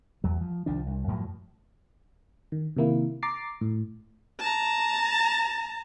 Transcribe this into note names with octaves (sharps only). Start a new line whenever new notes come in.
E2 F#3
F3
C2 D#3 F3 D4
C2
F#2 A2 F3 F#3
D#3
C3 D#3 A#3 E4
A#5 D6 A6 C7
A2
A5 A#5